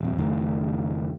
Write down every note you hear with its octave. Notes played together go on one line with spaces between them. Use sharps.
D#1 F2
F#1 F2 D#3 A3